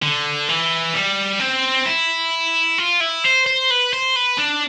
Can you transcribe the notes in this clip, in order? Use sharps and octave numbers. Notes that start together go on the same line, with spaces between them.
D3
E3
G3
C4
E4
F4
E4
C5
C5
B4
C5
B4
D4